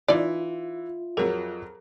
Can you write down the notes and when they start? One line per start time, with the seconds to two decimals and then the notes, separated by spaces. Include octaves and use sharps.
0.08 E3 D#4 F4 D5 E5
1.17 F2 F#3 G#4 A#4